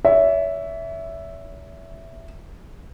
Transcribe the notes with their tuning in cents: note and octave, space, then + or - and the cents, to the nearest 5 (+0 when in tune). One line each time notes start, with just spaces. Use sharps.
C#5 +40 E5 +0